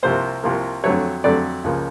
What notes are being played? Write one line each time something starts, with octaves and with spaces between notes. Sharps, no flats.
C2 C3 F3 A#3 C5
C2 C3 F3 A#3
F2 D3 F#3 A3 C#5
F2 D3 F#3 A3 D5
C#2 C#3 F3 A#3